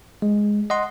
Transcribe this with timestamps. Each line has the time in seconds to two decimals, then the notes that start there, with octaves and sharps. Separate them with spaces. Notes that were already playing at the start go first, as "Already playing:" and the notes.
0.22 G#3
0.70 D#5 F#5 C6